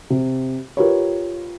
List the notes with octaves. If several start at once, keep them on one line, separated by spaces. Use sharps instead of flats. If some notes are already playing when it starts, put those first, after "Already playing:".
C3
F4 G4 A#4 B4 C#5